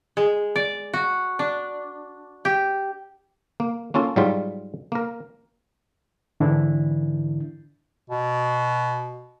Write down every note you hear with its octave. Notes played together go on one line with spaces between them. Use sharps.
G#3
D5
F#4
D4
G4
A#3
A#3 C#4 F4 A4 A5
G#2 F#3 G3 F4
A#3 A#4
G#2 D3 E3 D4 E4
B2